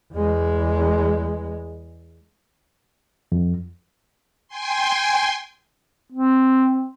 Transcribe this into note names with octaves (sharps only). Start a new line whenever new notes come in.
E2 G#3
F2
G5 G#5 C6
C4